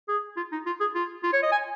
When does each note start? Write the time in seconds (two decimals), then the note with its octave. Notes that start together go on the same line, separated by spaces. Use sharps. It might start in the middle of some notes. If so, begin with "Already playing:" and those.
0.08 G#4
0.37 F4
0.52 D#4
0.66 F4
0.80 G#4
0.95 F4
1.23 F4
1.33 C#5
1.43 D#5
1.52 G#5